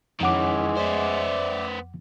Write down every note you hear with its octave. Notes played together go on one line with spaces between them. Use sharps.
F2 D#3 E3 G#3 C#4 F#5 D6
B3 C5 D5 E5